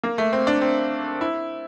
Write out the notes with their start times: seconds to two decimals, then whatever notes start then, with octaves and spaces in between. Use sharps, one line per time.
0.04 A#3
0.18 A3
0.33 C4
0.47 D4
0.61 C4
1.21 E4